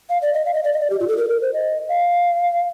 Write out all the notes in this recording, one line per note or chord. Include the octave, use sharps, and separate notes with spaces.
F5
D5
D#5
F5
D#5
D5
D#5
D5
G4
F4
A4
A#4
A#4
C5
D#5
F5